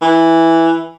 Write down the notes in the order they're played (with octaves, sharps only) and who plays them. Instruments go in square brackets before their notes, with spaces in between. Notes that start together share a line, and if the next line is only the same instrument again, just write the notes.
[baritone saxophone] E3